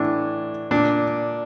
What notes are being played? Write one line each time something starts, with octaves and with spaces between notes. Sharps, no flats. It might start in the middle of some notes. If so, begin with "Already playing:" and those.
Already playing: A2 E3 D4
A#2 D4